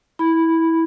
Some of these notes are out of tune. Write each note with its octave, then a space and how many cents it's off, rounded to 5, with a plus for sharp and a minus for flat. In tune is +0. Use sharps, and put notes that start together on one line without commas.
E4 -15 B5 +0